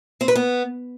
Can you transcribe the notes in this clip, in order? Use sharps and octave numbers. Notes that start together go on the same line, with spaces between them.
C4
B4
B3